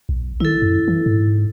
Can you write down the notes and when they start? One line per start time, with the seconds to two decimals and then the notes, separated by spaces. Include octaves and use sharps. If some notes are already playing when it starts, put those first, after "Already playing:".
0.09 B1
0.40 D#3 E4 A4
0.62 F#2
0.88 E3
1.06 G#2